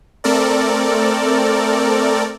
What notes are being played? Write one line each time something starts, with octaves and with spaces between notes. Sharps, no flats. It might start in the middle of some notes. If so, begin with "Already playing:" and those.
A3 C4 A4 A#4 D5